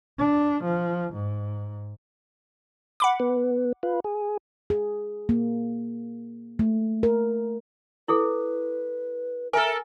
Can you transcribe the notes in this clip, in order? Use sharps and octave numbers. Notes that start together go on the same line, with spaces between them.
D4
F3
G#2
F#5 B5 D6
B3
F4 B4
G#4
G#4
A#3
A3
A#4
E4 G#4 A4 B4
A4 A#4 E5 G#5